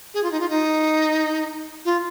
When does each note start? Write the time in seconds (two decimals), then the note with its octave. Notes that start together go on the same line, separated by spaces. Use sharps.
0.14 G#4
0.23 F4
0.31 D#4
0.40 F4
0.49 D#4
1.85 F4